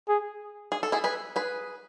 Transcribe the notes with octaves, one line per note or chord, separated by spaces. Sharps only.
G#4
G#4
A4
E4 G#4
G#4 B4
G#4 B4